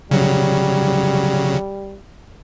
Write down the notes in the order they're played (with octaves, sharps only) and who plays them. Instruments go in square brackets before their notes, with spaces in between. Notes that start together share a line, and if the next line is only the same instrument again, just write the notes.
[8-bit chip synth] C#3 F#3 [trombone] G3